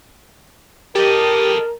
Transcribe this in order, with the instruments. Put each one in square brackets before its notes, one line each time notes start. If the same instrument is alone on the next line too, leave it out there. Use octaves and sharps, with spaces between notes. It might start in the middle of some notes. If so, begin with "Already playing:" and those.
[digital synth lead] G4 [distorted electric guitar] A4 D#5 [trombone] A#4